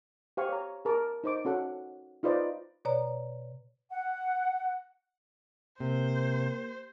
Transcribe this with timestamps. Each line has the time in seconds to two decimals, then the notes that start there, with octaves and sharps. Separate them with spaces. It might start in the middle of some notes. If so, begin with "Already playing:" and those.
0.37 G4 C5 F5 G#5 C#6
0.49 C#5 A#5
0.85 G#4 A#4 A5 D6
1.24 D#4 C5 D6
1.45 C#4 F#4 A4 F#5
2.23 D#4 F4 B4 C5 D5 D#5
2.85 B2 C#5 D5 A#5
3.91 F#5
5.80 C3 A#3 C5